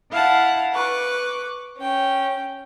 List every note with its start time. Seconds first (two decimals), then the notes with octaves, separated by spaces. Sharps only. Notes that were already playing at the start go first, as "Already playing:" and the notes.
0.12 E4 F5 F#5 A5
0.74 B4 C#6 D6
1.77 C#4 G5